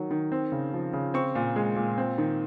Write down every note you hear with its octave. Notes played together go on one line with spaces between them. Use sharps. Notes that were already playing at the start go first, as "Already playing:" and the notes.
Already playing: D#3 F#3
D#3
C4
C#3
F3
C#3
C4 C#6
A#2
G#3
A#2
C4
D#3